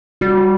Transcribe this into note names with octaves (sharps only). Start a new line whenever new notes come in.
G3 F#4